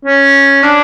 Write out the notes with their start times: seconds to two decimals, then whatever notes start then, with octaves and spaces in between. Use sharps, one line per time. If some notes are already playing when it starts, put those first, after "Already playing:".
0.05 C#4
0.63 D4